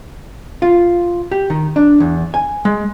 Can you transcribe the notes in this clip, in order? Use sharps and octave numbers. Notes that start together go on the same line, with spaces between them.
F4
G4
D#3
D4
E2
G#5
G#3